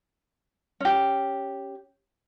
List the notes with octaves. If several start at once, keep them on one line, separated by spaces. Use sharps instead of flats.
C#4 G4